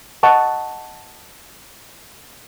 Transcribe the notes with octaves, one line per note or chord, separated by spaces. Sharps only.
D#5 F#5 A5 C#6